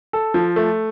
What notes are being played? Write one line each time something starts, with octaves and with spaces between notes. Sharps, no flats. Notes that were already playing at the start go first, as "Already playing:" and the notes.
A4
F3
A3